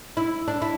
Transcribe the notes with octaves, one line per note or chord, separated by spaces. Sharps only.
E4
D4
E4